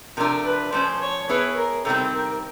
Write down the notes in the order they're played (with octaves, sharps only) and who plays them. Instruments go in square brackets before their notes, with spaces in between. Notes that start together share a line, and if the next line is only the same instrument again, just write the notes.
[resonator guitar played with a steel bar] C3 F3 A3 D4 [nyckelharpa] A#4
[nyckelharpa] B4
[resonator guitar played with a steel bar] F3 A3 C#4 [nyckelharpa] C5
[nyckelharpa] C#5
[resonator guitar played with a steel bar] B3 E4 G#4 C#5 [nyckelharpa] B4
[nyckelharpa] A#4
[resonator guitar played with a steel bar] C3 D#3 G3 C4 [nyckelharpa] A4
[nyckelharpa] A#4